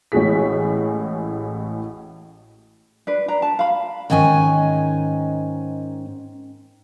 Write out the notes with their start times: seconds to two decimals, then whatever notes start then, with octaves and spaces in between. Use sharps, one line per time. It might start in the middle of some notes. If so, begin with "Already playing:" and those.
0.12 A1 A2 G#3 F#4 G#4 B6
3.07 D4 B4
3.28 D4 A#5
3.42 A5
3.59 F5 B5
4.10 G#2 D#3 C#4 D#5 G#5